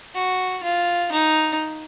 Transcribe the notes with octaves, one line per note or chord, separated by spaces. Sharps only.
F#4
F4
D#4